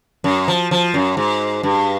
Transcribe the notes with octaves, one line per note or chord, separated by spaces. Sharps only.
F#2
F3
F3
F#2
G#2
G2